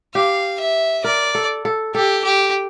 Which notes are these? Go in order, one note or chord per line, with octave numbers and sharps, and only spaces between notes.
G4 F5
E5
A#4 D5
A4
A4
G4 A4
G4